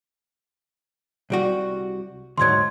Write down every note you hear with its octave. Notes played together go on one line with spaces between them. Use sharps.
C2 G3 F#4
D2 G#2 F#3 C6 G#6